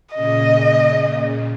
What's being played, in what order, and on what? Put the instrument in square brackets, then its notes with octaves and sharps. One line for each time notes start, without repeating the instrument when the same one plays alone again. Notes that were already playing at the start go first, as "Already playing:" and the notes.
[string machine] A#2 C#3 [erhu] D#5